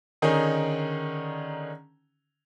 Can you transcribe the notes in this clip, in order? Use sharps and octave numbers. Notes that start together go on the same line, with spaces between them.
D3 D#3 C#4 D#4 G#4